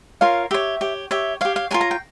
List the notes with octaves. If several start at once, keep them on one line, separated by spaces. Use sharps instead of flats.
F4 A#4 C#5 F5
G4 C#5 E5
G4 C#5
G4 C#5 E5
G4 C#5 F5
F5
F4 A#4 C#5 G#5
A#5
G5